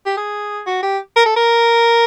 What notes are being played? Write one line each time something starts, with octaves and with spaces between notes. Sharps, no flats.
G4
G#4
F#4
G4
A#4
A4
A#4